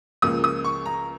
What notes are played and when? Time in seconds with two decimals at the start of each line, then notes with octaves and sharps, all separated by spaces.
0.22 C#2 C#3 F3 A#3 D#6
0.44 D#6
0.64 C#6
0.86 A#5